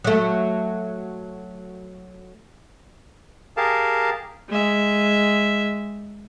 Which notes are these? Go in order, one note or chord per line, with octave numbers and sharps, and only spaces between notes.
F#3 A3
G4 G#4 A#4 F5 A5
G#3 E5